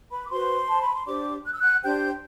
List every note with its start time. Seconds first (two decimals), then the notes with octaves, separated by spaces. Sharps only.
0.11 B4 B5
0.26 D6
0.30 F#4 B4 C5 C6
0.69 A5
0.81 B5
0.94 C6
1.06 D4 G4 C5 D5 D6
1.45 F#6
1.53 E6
1.61 F#5 F#6
1.82 D4 G4 C5 G5 G6